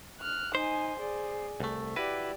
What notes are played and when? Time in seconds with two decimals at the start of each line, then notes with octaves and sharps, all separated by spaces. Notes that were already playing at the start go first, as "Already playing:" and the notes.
0.20 F6 F#6
0.55 D#4 C5 G#5
0.99 G#4 D5
1.60 C2 A3
1.96 E4 F#4 G4 B4 D5